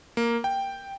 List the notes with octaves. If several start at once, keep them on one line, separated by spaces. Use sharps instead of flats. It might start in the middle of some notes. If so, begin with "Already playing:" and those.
A#3
G5